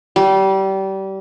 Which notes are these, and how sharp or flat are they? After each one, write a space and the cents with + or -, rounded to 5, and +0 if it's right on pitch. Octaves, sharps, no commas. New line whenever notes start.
G3 -25